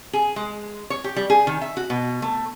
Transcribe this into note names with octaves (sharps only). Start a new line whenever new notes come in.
G#4
G#3
C#5
G4
G3
G#4
D#3
E5
F#4
B2
A3